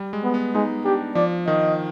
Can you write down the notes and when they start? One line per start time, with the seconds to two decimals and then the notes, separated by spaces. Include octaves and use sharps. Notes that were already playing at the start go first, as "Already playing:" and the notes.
Already playing: G3
0.13 G#3
0.24 B3
0.34 B3
0.54 G#3 D#4
0.85 D4 G4
1.15 F3 D5
1.46 D#3 D#5